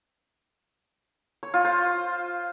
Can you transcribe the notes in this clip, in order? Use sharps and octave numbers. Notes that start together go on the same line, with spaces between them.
C#5
F4
C5